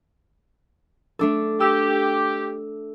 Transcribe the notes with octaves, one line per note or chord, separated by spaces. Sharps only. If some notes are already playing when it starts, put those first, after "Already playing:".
A3 D4 A4
G4 E6